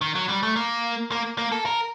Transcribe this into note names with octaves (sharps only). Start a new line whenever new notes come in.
D#3
F#3
G3
A3
A#3
A#3
A#3
A4
A#4